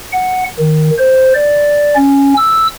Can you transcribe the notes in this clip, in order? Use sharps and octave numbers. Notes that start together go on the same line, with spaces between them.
F#5
D#3
C5
D5
C#4
E6